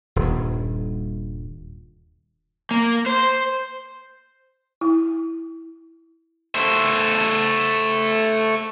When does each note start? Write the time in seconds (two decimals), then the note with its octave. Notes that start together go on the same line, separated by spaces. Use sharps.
0.16 D#1 G2
2.71 A#3
3.06 C5
4.81 E4
6.55 A3 C5